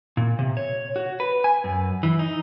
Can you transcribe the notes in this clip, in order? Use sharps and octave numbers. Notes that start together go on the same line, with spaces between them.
A#2
C3
C#5
F#4
B4
G#5
F#2
E3
D#4